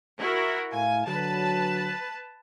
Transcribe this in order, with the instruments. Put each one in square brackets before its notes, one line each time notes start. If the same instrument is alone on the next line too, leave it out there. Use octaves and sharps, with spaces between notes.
[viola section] E4 F#4 A#4
[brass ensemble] A2 E4 F5 [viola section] G#5
[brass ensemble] D3 F#3 [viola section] B4 A5